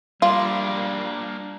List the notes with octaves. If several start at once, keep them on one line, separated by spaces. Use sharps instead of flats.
G3 A#3 D4 F4